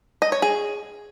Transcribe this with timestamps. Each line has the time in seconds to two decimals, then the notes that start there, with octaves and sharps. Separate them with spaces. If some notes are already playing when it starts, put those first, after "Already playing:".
0.22 D#5
0.32 C#5
0.42 G#4